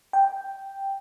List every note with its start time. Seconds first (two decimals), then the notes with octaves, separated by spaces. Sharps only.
0.13 G5